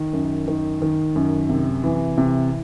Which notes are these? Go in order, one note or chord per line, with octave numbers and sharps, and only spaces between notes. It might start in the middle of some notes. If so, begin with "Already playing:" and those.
Already playing: D#3
F#2
D#3
D#3
F#2
C3
E3
C3